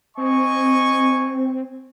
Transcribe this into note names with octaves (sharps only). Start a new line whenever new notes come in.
C4 D#5 G#5 C#6